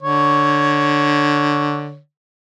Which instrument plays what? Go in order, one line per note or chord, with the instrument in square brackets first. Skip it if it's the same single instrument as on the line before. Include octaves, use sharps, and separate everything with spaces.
[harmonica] D3 C#5